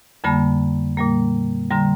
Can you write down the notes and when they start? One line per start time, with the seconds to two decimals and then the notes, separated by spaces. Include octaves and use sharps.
0.24 F2 D3 G3 A#3 A5 B5
0.97 A#2 G3 A#3
1.71 D3 G3 A#5 C6